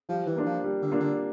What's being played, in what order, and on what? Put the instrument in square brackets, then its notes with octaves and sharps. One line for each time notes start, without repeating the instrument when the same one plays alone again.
[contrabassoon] F3 [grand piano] G3
[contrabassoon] E3
[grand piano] A#3 D4 F4
[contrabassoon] F3
[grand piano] G3
[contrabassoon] D3
[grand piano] A#3 D4 F4
[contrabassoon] D3